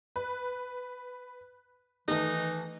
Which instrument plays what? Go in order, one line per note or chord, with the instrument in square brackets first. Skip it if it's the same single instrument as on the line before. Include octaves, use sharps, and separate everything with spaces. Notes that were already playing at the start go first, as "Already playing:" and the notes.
[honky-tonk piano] B4
[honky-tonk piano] D#3 A3 A4 [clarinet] E3 [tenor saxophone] D#4